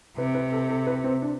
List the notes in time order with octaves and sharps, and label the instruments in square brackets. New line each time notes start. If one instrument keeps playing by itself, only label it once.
[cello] C3 [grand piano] B4
[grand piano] B4
A4
A4
B4
C4
D4